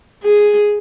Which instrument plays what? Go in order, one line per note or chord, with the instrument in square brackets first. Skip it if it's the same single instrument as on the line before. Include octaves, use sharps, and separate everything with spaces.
[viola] G#4